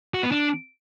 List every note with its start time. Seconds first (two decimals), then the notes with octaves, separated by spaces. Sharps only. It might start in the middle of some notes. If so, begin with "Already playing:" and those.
0.14 F#4
0.23 B3
0.32 D4